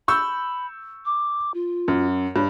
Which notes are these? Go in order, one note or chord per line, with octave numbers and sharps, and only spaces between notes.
B5 C#6 E6 G6
D6
F4
F#2
G2 C#5